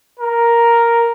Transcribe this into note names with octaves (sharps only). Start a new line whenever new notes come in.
A#4